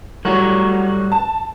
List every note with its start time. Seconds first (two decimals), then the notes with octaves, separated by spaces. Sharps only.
0.25 A2 F#3 G3 F#4
1.12 A5